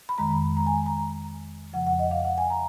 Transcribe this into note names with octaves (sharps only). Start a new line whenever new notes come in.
B5
F2 D#3 G#3 A#5
A#5
G#5
A#5
F2 C#3 F3 F#5
F#5
D#5
F5
F#5
G#5
A#5